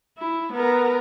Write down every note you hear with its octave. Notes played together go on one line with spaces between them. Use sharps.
E4
B3 A#4